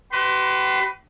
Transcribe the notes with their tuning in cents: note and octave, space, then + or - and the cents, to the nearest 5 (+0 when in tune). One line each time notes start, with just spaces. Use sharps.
G4 -45 B4 +20 C6 +0